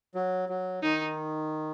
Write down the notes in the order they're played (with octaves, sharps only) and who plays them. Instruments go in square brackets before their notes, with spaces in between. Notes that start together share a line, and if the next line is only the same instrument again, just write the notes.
[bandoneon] F#3
F#3
[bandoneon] D#3 [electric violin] D#4